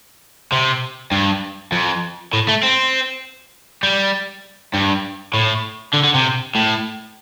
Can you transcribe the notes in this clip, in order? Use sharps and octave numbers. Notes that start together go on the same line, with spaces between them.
C3
G2
F2
A2
A3
C4
G3
G2
A2
D3
D3
C3
A2